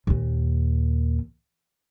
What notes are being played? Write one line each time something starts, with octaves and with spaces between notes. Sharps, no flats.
D#2 A#2